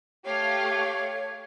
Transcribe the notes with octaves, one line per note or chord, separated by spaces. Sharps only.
A3 G4 C#5 F5